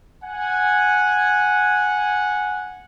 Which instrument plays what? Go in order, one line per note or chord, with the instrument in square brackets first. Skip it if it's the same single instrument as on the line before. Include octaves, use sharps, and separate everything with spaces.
[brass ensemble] F#5 G#5